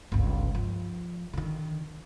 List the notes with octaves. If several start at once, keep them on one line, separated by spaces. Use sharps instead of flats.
G1 C#2
F3
D3 D#3